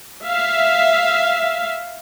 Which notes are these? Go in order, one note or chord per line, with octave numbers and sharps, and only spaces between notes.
E5 F5